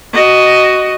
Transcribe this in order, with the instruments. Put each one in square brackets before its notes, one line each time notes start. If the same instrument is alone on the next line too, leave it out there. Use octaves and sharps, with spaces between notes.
[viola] F#4 D#5